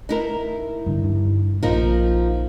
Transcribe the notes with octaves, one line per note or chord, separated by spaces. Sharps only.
D#4 E4 A#4
G2 D3
G2
A#1 A#2 F3 D#4 A#4